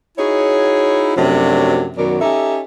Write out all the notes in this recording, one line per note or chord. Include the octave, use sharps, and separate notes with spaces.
D#4 E4 F#4 G#4 C#5
F#2 C3 F3 F#3 A3 D4
F#2 B2 D#3 F#3 A#4 D5
C#4 D#4 G4 A4 E5